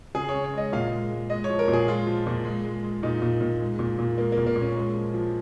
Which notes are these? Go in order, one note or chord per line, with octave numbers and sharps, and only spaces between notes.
C#3 G#4
C#5
C#3
C#5
G#3 D#5
A#2 F5
G#3
G#3
G#3 D#5
C#5
F3
A#4
A#2
G#4
G#3 F4
F3
A#2
G#3
G#3
G#3
A#2 D#4
A#2
A#2
G#3
A#2
A#2
G#3 A#3
A#3
A#2
A#3
A#2
C#4
G#3
F3
F3